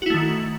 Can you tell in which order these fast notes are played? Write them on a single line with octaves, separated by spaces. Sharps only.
F#4 E4 A3 D#3